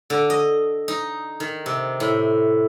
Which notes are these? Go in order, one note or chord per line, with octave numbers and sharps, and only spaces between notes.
D3
D#5
D#4
D#3
C3
A2